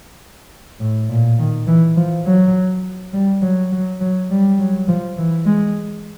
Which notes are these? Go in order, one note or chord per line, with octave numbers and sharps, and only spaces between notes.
A2
A#2
D#3
E3
F3
F#3
G3
F#3
F#3
F#3
G3
F#3
F3
E3
G#3